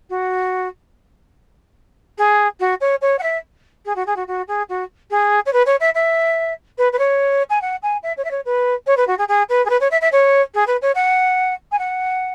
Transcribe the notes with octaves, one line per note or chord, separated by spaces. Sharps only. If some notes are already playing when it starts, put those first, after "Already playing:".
F#4
G#4
F#4
C#5
C#5
F#5
E5
G#4
F#4
G#4
F#4
F#4
G#4
F#4
G#4
C#5
B4
C#5
E5
E5
B4
B4
C#5
G#5
F#5
G#5
E5
C#5
E5
C#5
B4
C#5
B4
F#4
G#4
G#4
B4
G#4
B4
C#5
E5
E5
C#5
G#4
B4
C#5
F#5
G#5
F#5